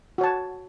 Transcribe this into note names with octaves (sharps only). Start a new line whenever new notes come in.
F#4 C#5 A5